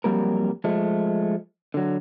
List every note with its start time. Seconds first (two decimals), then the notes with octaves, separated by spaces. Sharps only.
0.04 F2 F#3 G3 A#3 A#4
0.64 F3 G#3 A3
1.74 D3 F#3